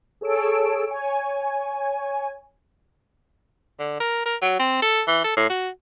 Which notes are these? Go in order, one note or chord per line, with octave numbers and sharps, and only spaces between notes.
G#4 A4 C#5 E6 D7
C#5 G#5
D3
A#4
A#4
F#3
C4
A4
E3
A4
A2
F#4